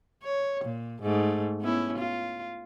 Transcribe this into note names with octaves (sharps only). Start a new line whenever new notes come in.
C#5
A#2
G#2 A3
B3 C#4 E4
F4